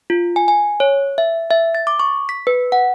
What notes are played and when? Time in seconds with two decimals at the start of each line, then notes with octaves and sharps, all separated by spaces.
0.10 F4
0.36 G#5
0.48 G#5
0.80 C#5
1.18 E5
1.51 E5
1.75 A6
1.87 D6
1.99 C#6
2.29 B6
2.47 B4
2.72 F#5